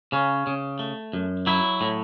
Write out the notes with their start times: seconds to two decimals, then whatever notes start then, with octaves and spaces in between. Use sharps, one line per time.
0.12 C#3 C#4
0.47 C#3
0.79 A3
1.13 F#2
1.46 F#3 E4
1.81 A2